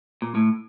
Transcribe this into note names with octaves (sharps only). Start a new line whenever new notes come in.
A#2
A2